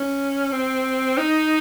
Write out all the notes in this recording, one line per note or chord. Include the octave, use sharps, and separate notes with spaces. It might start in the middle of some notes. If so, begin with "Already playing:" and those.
Already playing: C#4
C4
D#4